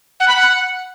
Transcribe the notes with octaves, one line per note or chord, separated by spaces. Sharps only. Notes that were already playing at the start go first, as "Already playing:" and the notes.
F#5
B5
F#5